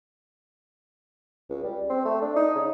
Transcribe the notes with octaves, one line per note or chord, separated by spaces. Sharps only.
C#2
G3
C4
A3
D4
D#4
C#3